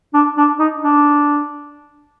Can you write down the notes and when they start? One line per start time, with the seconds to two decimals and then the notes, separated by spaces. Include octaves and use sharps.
0.14 D4
0.37 D4
0.59 D#4
0.84 D4